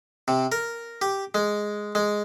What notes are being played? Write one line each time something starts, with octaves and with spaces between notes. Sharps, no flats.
C3
A#4
G4
G#3
G#3